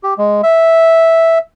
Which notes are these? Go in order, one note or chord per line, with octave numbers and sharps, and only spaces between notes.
G4
G#3
E5